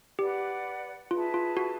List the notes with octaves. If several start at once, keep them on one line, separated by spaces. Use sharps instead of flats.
G4 B4 D5 F#5
F4 G#4 B4 E5 A5
F4
F#4